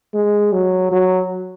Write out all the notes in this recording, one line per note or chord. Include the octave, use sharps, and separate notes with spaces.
G#3
F#3
F#3